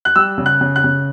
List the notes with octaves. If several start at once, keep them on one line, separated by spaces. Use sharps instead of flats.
F#6
G3 E6
C#3
F#6
C#3
F#6
C#3